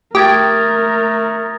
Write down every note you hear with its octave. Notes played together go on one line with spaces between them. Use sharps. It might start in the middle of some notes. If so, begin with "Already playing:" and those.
A3 G4 A#4 D#6 G#6 A6